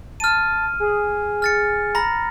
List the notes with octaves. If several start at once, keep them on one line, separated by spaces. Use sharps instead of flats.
A5 F6 D#7
G#4
F6 A6 C#7
A#5 B5 A#6